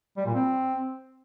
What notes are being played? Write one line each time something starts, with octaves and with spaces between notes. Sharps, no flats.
G3
A#2
C4